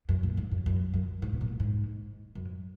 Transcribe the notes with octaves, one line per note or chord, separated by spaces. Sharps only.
F#2
A#2
G#2
F#2
F#2
F#2
G#2
B2
A#2
G#2
F#2